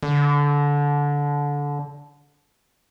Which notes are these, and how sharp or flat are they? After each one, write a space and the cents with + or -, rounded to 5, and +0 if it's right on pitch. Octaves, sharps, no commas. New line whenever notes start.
D3 -20